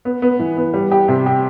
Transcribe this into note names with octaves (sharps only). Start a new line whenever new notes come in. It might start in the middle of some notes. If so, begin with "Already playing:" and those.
B3
B3
E3
B3
G3
G4
C3
G4